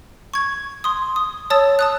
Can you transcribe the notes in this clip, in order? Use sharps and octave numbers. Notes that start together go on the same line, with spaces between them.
C#6 G#6
C6 D#6
D#6
C#5 A5 D#6 E6 A6
A5 D#6 F#6